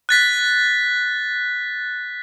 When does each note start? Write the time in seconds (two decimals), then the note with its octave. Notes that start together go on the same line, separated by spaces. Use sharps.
0.09 F#6 A6 B6